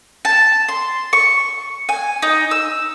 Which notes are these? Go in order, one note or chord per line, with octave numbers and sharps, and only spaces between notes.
A5
C6
C#6
G#5
D#4
E6